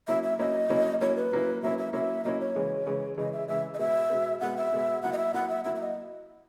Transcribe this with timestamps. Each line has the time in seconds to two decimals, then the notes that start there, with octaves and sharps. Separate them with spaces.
0.08 F#3 A#3 C#4 E4 E5
0.23 E5
0.39 F#3 A#3 C#4 E4 D#5
0.70 F#3 A#3 C#4 E4
1.01 F#3 A#3 C#4 E4 C#5
1.16 B4
1.32 F#3 A#3 C#4 E4
1.63 F#3 A#3 C#4 E4 E5
1.78 E5
1.93 F#3 A#3 C#4 E4 E5
2.24 F#3 A#3 C#4 E4 D#5
2.40 C#5
2.56 C#3 E3 G#3
2.87 C#3 E3 G#3
3.17 C#3 E3 G#3 D#5
3.33 E5
3.48 C#3 E3 G#3 E5
3.74 D#5
3.79 B2 G#3 B3 E5
4.10 B2 G#3 B3
4.41 B2 G#3 B3 F#5
4.57 E5
4.73 B2 G#3 B3
5.03 F#3 A#3 E4 F#5
5.13 D#5
5.18 E5
5.34 F#3 A#3 E4 F#5
5.49 E5
5.64 F#3 A#3 E4 E5
5.75 E5
5.81 D#5